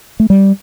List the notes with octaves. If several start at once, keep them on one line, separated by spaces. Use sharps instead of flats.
A3
G3